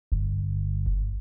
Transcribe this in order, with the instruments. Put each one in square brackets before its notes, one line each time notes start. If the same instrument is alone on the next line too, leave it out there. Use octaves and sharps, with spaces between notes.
[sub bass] G1